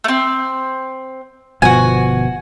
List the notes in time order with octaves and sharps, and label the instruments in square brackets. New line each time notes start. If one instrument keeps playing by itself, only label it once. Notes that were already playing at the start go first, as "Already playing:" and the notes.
[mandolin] A3 C4
[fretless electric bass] G1 B2 F3 [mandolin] F#4 G#5